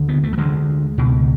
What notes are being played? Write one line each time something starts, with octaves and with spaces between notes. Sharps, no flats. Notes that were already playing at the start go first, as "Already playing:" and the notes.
Already playing: D2 D3
B3
A3
F#3
D2 D3 G#3
C#2 B2